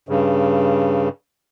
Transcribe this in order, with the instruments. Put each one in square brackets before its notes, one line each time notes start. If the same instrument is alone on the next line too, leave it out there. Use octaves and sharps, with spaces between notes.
[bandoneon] G2 C#3